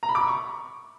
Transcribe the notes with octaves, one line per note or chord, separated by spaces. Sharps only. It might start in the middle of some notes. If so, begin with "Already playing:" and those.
A#5
B5
D6
B5
C#6